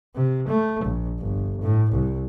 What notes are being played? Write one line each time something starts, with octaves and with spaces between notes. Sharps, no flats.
C3
A3
A#1
G1
A2
C2